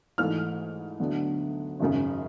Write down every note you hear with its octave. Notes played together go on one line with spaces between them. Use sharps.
G#2 E3 A3 F6
D2 D3 F#3 B3 D4
G#1 F#2 C#3